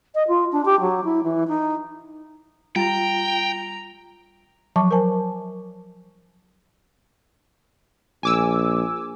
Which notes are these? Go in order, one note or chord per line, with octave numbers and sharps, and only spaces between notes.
D#5
F4
D4
G4
F#3
E4
E3
D#4
G3 F4 G5 A#5
F3 F#3 A5 C#6 D6
A#4 C5 G#5 A5
A#1 G#5 D6 E6